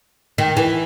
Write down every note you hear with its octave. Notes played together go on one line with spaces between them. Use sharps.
D#3
E3